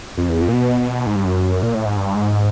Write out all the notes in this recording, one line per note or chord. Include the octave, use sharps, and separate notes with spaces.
F2
E2
F2
A#2
B2
G#2
G2
F#2
A#2
A2
G#2
G2
G#2